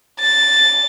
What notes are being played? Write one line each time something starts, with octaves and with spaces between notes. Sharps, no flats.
A6